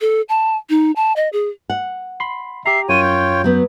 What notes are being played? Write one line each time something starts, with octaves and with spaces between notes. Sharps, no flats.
A4
A5
D#4
A5
D#5
G#4
F#5
B5 C6 C7
G4 E5 A#5 C7
F#2 F4 C#5 G5 D#7
G6
F#3 B3